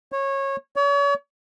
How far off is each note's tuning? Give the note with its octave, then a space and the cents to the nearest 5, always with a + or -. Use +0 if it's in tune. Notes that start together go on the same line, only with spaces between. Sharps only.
C#5 -20
C#5 +40